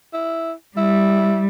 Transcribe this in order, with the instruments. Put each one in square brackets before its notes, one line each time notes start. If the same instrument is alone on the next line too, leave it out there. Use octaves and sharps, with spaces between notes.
[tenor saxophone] E4
[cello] G3 [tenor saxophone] E4